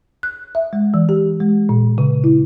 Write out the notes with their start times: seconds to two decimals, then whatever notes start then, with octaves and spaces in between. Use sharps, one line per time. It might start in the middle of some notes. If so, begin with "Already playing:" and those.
0.23 F#6
0.55 E5
0.73 G#3
0.94 E3
1.09 G4
1.41 G#3
1.69 A#2
1.98 C#3
2.24 E4